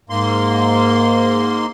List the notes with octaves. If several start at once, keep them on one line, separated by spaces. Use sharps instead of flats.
G#2 A#3 C6